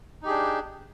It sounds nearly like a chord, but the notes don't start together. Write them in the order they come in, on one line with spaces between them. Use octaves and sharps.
D#4 G4 G#4 D4